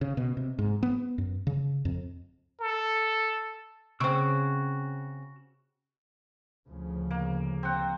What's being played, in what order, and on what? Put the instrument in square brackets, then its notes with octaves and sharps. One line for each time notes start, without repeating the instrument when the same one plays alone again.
[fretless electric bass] C#3
B2
C3
G#2
B3
F#2
C#3
F2
[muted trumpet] A4
[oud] C#3 C4 [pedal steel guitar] F#4 C#6 E6
[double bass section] D2 C#3 F3
[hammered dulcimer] A#3
C4 F#5